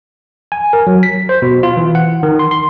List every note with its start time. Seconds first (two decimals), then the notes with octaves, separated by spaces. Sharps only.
0.52 G#5
0.73 A#4
0.87 F#3
1.03 B6
1.29 C5
1.42 B2
1.63 F4
1.77 E3
1.95 F#5
2.23 D#3
2.39 C6
2.51 C6